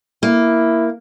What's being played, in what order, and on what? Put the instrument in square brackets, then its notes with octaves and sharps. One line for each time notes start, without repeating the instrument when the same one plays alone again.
[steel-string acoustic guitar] A#3 [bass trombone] E4